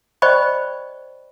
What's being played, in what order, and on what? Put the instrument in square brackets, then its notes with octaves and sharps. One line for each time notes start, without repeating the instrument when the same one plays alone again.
[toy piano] C5 D5 D#5 G5 B5 C#6